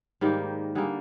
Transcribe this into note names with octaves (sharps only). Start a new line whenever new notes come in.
G#2 D#3 G3 A#3 G4
D3 G3 A#3 G#4